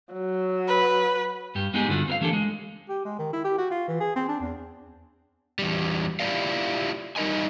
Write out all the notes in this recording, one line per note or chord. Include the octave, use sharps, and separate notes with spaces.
F#3
B4
G2 G4
G3 G#3 B3 D#4 G4 G#4
G2 D3 F4 F#4
C4 A#4 F5
E3 A#3 D4 G4 A4
G#3
G4
G#3
D#3
E4
G4
F#4
F4
E3
G#4
C4
D4
E2
E2 G3
E4 F4 G4 C#5 D5 F5
G3 D#4 A#4 D#5 G#5